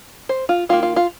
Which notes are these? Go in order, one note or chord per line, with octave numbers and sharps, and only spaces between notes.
C5
F4
D#3 G3 A#3 F4
F4
F4